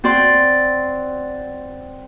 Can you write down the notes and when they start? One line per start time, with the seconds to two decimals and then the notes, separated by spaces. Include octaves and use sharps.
0.04 C4 F#4 D5 C6